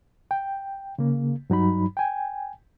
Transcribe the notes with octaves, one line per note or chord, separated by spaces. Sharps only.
G5
C#3 A#3
G2 F#3 D#4 B5
G5 G#5